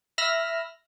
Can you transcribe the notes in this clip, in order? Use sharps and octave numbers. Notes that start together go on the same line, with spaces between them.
E5 B5 E6 F6 A#6